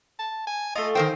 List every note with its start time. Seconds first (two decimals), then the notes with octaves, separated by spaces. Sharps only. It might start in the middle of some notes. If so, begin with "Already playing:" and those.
0.19 A5
0.47 G#5
0.75 A3 F4 D#5
0.95 D#3 A#4 C5 G5